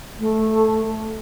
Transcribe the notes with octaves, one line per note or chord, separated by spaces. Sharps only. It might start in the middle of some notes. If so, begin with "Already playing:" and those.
A3